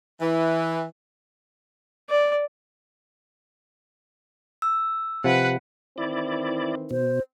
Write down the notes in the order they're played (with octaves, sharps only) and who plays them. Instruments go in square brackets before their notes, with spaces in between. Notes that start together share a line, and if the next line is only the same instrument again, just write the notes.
[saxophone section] E3
[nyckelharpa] D5
[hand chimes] E6
[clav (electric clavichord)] C3 F3 [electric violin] B4 F#5
[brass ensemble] D#3 E3 C4 [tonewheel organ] E4 D5
[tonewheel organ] B2 [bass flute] C5